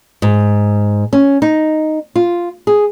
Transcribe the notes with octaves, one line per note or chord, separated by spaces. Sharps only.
G#2
C#4
D#4
F4
G#4